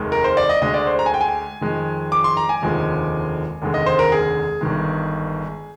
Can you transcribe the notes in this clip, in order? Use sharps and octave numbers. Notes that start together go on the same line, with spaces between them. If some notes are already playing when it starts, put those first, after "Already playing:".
Already playing: F1 D#2 D#3 G#3
A#4
C5
D5
D#5
D2 D3 G#3 D#5
D5
C5
A#5
G#5
G5
G#5
F2 D#3 G#3
D6
C6
A#5
G#5
F1 D#2 D3 F3 G#3
F1 D#2 D3 G#3
D#5
C5
A#4
G#4
G1 G2 D#3 G#3